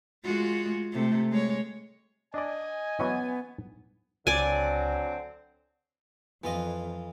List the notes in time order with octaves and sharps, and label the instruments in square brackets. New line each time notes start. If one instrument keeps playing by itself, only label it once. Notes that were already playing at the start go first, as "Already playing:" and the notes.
[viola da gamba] G#3 F4 F#4
C3 A3
G#3 C#5
[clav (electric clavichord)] D4 D5 [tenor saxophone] D#5 [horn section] G#5
[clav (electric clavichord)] E3 F#3 C#4 [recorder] B3
[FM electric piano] C#2 [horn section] D3 F#3 C4 [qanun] D5 G#5
[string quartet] F2 [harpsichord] E3 F4 D#5